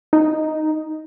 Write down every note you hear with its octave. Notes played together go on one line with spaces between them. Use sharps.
D#4